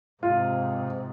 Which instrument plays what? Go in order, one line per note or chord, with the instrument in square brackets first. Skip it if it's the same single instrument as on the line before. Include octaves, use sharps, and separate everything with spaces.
[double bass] G#2 C3 [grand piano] F4